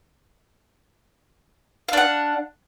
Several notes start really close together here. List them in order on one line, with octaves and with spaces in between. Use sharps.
F5 D4 F#5